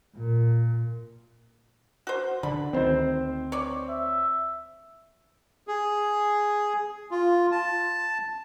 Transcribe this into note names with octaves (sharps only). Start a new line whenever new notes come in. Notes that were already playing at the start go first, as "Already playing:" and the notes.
A#2
F#4 C5
D3 B5
D2 D#3 C4 C5
C#5 D5
E5
G#4
F4
A5